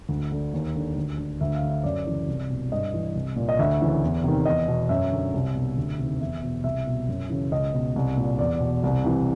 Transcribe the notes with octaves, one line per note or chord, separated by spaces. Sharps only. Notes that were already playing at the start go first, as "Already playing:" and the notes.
D2
D3
D#2
D3
D2
D3
D2 E5
F5
D3
E5
F#2 D5
C#3 E3
C2
B2
G2 D#5
E3
C2
A#2
D#5
D2 E5
C#3 E3
E2
C3 D#3
E2 D#5
B2
F#2 E5
D3
C2
B2
D2
C3 D#3
E2 E5
B2
C2 E5
B2
F#2
C#3 E3
C#2 D#5
B2
C2
A#2
E2 D5
B2
C2
C3 E3